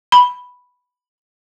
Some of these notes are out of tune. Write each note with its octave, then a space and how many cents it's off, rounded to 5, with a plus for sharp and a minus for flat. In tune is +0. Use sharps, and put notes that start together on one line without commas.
B5 +0